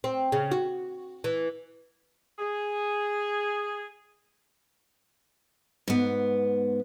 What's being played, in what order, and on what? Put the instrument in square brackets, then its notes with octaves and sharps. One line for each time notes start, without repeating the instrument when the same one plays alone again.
[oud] C4
C#3
F#4
E3
[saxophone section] G#4
[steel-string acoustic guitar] G#2 B3